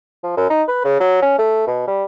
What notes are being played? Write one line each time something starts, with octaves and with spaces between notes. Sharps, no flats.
F3
F#2
D#4
B4
C#3
F#3
C#4
A3
B2
G3